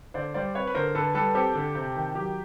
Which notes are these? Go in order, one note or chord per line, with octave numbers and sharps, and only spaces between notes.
D3 C5 D5
G3 C5 D5
C4 B4 C#5
B4
D3 A#4 C5
D3 A4 B4
G3 A4 B4
C4 G4 A4
D3
C3
D#3
F#3 G4